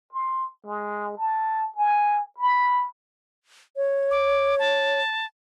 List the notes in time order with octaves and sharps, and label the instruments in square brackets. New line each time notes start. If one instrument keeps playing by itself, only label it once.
[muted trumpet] C6
G#3
A5
G#5
B5
[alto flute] C#5
[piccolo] D6
A5